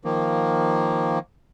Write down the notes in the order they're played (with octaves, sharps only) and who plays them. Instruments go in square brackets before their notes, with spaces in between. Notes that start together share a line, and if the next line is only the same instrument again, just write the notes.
[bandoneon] D#3 F3 A#3